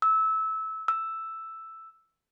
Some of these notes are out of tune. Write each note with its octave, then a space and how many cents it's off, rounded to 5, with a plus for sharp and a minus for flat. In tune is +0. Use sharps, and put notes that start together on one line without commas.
E6 -20
E6 +0